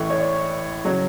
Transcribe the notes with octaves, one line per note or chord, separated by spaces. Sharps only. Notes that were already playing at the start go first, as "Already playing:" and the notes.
Already playing: A1 A2 E3 C#6
C#5
D5
C#3 F#3 C#5